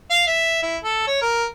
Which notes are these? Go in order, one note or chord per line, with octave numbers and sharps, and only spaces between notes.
F5
E5
E4
A4
C#5
A#4